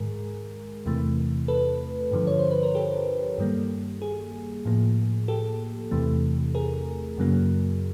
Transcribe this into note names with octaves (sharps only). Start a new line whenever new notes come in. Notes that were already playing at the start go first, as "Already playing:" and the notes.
Already playing: G#2 D#3 G#3 G#4 A#4
E2 C3 E3 A3
A4 B4
G2 D3 F3
C#5
C5
B4
A#4
G4 A4
G2 D#3 G3 A#3
G#4
A2 F3 A#3
G4 A4
E2 C3 E3 A3
G#4 A#4
F#2 C#3 F#3 A#3